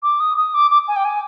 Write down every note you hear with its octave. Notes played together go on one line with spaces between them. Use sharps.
D6
D#6
D#6
D6
D6
G#5
G5
G#5